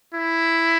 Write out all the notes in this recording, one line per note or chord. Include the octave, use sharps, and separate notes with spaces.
E4